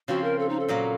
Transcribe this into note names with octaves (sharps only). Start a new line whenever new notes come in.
C#3 F3 C4 F#4
A#4
A4
D#4
A4
A#2 F#3 A#3